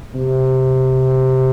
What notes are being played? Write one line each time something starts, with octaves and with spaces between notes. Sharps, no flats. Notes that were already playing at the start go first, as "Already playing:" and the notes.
C3